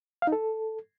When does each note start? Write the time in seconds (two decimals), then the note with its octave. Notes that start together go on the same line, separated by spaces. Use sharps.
0.22 F5
0.27 D#4
0.32 A4